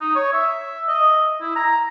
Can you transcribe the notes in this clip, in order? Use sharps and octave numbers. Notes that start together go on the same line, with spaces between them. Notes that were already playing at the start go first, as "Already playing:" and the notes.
D#4
C#5
E5
D#5
E4
A#5